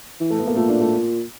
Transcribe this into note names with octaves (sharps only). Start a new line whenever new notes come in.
E3
A3
B3
A#3
A#2 A3
D4
A3